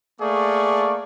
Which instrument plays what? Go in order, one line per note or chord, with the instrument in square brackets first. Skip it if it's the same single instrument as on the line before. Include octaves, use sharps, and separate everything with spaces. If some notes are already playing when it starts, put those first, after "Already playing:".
[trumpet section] A3 A#3 G#4 D5 F5 C#6